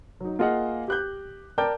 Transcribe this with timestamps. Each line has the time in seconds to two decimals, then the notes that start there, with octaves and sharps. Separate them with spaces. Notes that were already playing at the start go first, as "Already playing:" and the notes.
0.20 F#3 D#4
0.39 A#3 F4 G#4 D#5 F5 F#5
0.88 G4 F#6 G6
1.58 A#4 D5 G5 A5 D6 G6